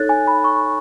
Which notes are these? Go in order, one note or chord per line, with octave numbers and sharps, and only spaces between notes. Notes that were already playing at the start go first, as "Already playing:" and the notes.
Already playing: D#4 A4 C#5 F#6 A6
G#5
B5
C#6